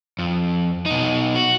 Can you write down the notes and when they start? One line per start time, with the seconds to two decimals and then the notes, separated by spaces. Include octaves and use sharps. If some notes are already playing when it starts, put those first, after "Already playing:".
0.19 F2
0.86 B2 D#4
1.35 F#4